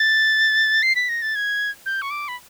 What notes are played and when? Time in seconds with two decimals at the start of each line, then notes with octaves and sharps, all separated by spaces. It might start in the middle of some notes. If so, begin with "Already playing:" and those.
Already playing: A6
0.83 C7
0.96 B6
1.09 A#6
1.22 A6
1.35 G#6
1.86 G6
2.02 C#6
2.11 D6
2.28 B5